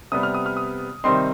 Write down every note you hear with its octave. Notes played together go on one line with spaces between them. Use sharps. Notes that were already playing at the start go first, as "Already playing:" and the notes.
C3 G3 B3 D#6
F6
D#6
F6
D#6
C3 D#3 G3 C4 D#4 C6